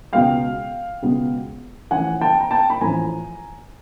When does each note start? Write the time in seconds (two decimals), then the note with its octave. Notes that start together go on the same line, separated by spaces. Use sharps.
0.13 C#2 B2 G#3 B3 F5 G5
1.02 C#2 B2 G#3 B3
1.91 A1 A2 F3 F#5 G#5
2.21 G5 A5
2.41 A#5
2.51 G5 A5
2.70 B5
2.81 A1 A2 F3 G#5 A#5